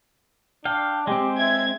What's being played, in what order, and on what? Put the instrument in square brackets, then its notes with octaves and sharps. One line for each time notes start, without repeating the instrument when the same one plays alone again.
[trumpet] D4 [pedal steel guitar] F5 G5
[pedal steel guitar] G#3 C4 [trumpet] G4
[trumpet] E5 [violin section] G#6